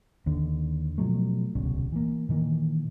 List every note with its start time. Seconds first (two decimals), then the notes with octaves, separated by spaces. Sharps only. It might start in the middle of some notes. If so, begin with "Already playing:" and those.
0.26 D#2 D3
0.98 B2 F3 F#3 A3
1.55 D1 C2 B2 C#4
1.92 E3 A#3
2.29 A#2 D#3 E3 A#3